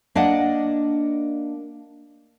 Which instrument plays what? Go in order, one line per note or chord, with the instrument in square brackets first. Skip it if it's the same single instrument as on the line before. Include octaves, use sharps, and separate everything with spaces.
[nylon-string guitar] A#3 D4 D5 D#5 F#5